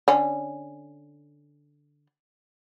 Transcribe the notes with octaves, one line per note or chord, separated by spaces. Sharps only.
D3 C#4